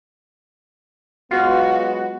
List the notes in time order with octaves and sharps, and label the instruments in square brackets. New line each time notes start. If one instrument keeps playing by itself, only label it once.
[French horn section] F#3 G#3 B3 [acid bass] F4 [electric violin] F#4